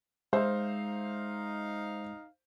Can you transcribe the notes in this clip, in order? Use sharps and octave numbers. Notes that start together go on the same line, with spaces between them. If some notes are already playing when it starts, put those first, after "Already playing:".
G#3 D#4 C5 E5 F5